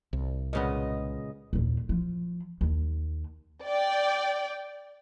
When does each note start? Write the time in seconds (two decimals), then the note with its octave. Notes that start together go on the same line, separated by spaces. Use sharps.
0.13 C2
0.53 A#2 C#3 G#3 B3 D#5
1.53 D#2 A#2
1.89 F3
2.61 D#2
3.66 D5 G5